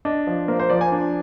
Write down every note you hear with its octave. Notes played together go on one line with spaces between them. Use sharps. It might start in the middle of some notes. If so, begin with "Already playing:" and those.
D4 D#5
F3
A#3 C5
C5
F3 D5
G#5
D4